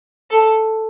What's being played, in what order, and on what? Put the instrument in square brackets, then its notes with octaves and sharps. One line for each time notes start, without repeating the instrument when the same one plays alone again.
[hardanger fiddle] A4